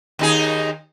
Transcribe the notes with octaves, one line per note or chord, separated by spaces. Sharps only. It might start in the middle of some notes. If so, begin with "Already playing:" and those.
D#2 D#4 G#4